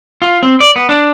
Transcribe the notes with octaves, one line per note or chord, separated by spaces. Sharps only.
F4
C4
D5
B3
D4